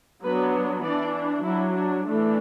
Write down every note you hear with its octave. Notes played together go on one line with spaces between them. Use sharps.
F#3 B3 D4 B4
E3 D4 D5
F#3 D4 E4
D4
E3 A3 D4